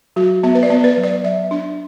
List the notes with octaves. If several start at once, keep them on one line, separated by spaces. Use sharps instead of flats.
F#3 F#4
B3 E5
B4
D5
B3
B4
F#3
D5
F#3 E5
D4